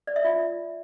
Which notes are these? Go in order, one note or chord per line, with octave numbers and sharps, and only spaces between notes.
D5
E5
F4